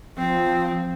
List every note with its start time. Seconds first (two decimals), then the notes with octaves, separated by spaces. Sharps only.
0.17 F3 C4